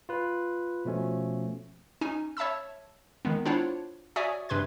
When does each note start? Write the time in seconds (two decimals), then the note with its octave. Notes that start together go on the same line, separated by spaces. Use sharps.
0.09 F4 B4
0.85 B2 F3 A3 C#4
2.01 C#4 D#4 G#5
2.37 C#5 E5 A5 B5 E6
3.25 D#3 G#3 B3
3.46 D4 E4 F4 C5 C#5 F#5
4.16 F#4 C#5 D5 E5 G#5 D#6
4.49 G2 C3 B4 C6 G#6